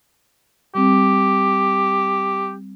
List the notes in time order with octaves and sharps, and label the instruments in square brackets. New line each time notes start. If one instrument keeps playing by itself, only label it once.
[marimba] G3 C4 [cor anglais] G4